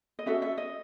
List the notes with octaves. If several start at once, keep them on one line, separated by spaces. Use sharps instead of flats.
D#5
C#4 F#4 A4 E5
E5
D#5